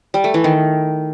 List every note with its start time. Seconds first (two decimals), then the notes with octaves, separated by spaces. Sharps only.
0.14 G3
0.24 A3
0.34 E3
0.44 D#3